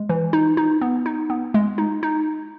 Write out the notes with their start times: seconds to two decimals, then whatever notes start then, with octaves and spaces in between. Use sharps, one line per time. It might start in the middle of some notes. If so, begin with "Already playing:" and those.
Already playing: G#3
0.09 E3
0.33 D#4
0.57 D#4
0.81 B3
1.06 D#4
1.30 B3
1.54 G#3
1.78 D#4
2.03 D#4